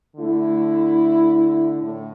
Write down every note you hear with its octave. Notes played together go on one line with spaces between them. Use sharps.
D3 A3 E4
A2